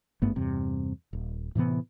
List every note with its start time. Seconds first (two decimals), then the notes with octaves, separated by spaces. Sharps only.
0.22 G#1 G2 A3 B3
0.36 E2 G2 C3
1.13 D#1
1.55 A2 C3 E3 B3